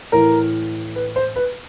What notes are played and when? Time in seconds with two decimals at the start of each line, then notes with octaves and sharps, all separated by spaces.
0.12 A2 E3 A#4
0.96 B4
1.16 C5
1.36 B4